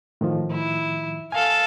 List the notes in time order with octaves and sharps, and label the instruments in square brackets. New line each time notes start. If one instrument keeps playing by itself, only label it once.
[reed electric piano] A2 D#3 F3
[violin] E4
[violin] A4 F5 [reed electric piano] G#5